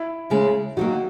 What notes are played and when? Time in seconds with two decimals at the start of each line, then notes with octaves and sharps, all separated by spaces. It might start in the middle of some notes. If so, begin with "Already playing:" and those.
Already playing: E4
0.30 D#2 C#3 G#3
0.77 D#3 F#3 A#3 F#4